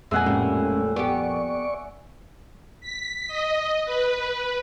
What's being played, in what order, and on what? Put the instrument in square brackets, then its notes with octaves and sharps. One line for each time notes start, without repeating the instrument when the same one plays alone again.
[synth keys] F2 A#2 [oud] G#3 [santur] E5 F#5 G#5
[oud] A2 G3 [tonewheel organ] G#3 C#4
[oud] B3 G4 [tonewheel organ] D5 C#6
[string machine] B6
D#5
B4